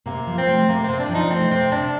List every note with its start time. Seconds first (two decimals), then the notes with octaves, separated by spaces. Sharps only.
0.06 C3 A#3
0.27 F3
0.37 C4
0.47 A3
0.69 C3 A#3
0.84 C4
0.89 C3
0.99 D4
1.09 F3
1.15 D#4
1.30 A3 C4
1.51 C3 C4
1.72 C3 D4